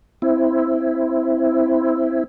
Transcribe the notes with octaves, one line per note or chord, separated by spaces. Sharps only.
C4 E4